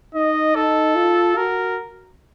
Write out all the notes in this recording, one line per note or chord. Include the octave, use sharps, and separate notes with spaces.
D#4 D#5
D#4 A4
F4
F#4 A#4